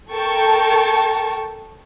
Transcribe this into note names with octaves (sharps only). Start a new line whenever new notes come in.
A4 A#4 G5 A5 C#6